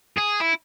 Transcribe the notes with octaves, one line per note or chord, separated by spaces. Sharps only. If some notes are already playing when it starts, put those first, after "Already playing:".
G#4
E4